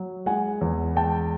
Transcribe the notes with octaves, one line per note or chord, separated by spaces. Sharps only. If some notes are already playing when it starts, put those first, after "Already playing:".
Already playing: F#3
G#3 F#5 G#5
E2
G#3 G5 A5